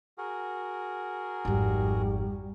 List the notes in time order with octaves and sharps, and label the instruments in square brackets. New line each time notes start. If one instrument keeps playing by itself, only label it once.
[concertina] F#4 G#4 A#4
[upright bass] G#1 F2 [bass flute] G3